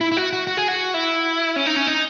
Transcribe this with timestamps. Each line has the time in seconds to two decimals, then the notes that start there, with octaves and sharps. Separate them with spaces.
0.01 E4
0.12 E4
0.17 F#4
0.33 F#4
0.47 F#4
0.57 G#4
0.68 F#4
0.94 E4
1.56 C#4
1.66 D#4
1.76 C#4
1.87 D#4